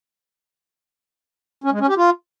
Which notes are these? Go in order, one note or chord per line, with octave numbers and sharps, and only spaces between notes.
C#4
G#3
C#4
G4
F4